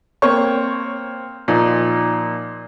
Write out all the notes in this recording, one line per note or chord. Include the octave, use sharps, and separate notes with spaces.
A#3 C4 C#5 C#6
A#2 F3 D#4